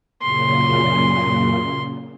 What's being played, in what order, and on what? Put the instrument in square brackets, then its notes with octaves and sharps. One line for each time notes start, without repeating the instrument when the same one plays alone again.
[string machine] F#2 A#2 C#3 [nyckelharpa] C6